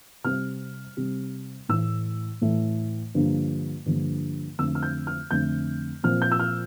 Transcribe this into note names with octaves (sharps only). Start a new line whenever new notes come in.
C3 G3 C4 F6
C3 G3 C4
A2 E3 A3 E6
A2 E3 A3
G2 D3 F3 A#3
G2 D3 F3 A#3
F2 D3 A3 E6
F6
G6
F6
F2 D3 A3 G6
A#2 F3 C4 F6
G6
E6
F6